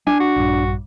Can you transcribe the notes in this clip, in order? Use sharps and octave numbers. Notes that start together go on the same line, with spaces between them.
D4 G#5
F#4
A#1 G2